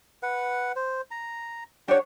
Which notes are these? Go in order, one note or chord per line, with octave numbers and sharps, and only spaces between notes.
B4 F#5
C5
A#5
D4 G4 C#5 F#5 G5